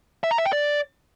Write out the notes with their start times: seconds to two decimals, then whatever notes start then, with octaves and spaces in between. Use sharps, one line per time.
0.24 E5
0.31 A#5
0.38 E5
0.45 G5
0.53 D5